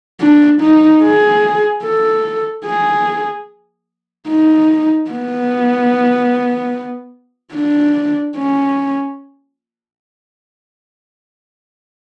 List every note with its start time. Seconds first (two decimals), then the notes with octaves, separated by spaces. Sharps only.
0.21 D4
0.62 D#4
1.03 G#4
1.84 A4
2.66 G#4
4.29 D#4
5.10 B3
7.54 D4
8.36 C#4